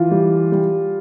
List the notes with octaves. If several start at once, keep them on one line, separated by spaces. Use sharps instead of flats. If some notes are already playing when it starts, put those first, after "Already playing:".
Already playing: E3 F4
G3
G3